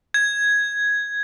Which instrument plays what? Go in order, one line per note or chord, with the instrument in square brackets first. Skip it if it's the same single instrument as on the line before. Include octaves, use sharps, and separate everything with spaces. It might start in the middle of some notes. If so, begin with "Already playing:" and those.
[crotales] G#6